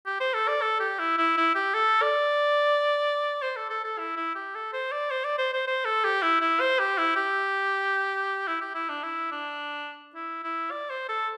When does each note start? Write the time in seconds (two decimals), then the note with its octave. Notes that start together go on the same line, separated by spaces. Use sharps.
0.06 G4
0.20 C5
0.34 A4
0.48 D5
0.62 A4
0.80 G4
0.99 E4
1.18 E4
1.37 E4
1.55 G4
1.74 A4
2.02 D5
3.42 C5
3.56 A4
3.70 A4
3.84 A4
3.98 E4
4.16 E4
4.35 G4
4.55 A4
4.73 C5
4.92 D5
5.11 C5
5.25 D5
5.38 C5
5.53 C5
5.67 C5
5.85 A4
6.04 G4
6.22 E4
6.41 E4
6.60 C5
6.79 G4
6.98 E4
7.16 G4
8.47 E4
8.61 G4
8.75 E4
8.89 D4
9.03 E4
9.31 D4
10.15 E4
10.44 E4
10.71 D5
10.90 C5
11.09 A4